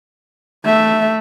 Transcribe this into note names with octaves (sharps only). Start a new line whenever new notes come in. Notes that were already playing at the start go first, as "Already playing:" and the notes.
A3 E5